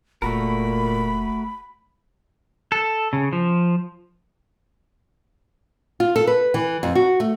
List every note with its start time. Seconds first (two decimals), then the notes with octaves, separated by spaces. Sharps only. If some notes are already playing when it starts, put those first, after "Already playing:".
0.22 F1 A#2 A3 F#4 A#4 B5
2.72 A4
3.13 C#3
3.33 F3
6.00 F4
6.16 A4
6.27 B4
6.54 E3
6.83 F2
6.95 F#4
7.20 A3